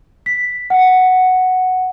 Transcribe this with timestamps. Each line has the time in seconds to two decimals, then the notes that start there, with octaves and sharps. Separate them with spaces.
0.26 B6
0.70 F#5